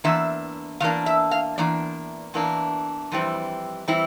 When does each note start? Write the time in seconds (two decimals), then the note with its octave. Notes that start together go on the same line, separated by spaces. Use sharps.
0.04 E2 E3 A#3 D4 E5
0.80 E2 E3 A#3 D4 F5
1.06 E5
1.31 F5
1.58 E2 E3 A#3 D4 D5
2.34 E2 E3 A#3 D4
3.12 F2 E3 G3 C4 E4
3.88 E3 G3 C4 E4